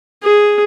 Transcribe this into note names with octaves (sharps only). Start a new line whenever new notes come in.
G#4